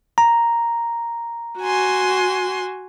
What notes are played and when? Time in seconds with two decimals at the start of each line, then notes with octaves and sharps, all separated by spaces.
0.18 A#5
1.60 F#4 G#5 C6